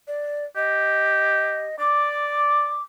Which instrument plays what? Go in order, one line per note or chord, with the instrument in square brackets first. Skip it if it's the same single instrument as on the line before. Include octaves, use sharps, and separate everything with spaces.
[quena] D5
[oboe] G4 [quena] D#5
[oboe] D5 [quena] D6